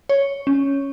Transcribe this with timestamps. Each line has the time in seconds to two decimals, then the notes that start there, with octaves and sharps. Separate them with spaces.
0.09 C#5
0.47 C#4